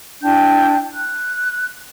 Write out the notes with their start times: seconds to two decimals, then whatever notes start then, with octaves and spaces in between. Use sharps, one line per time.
0.22 D4 E4 G5 G6
0.94 F#6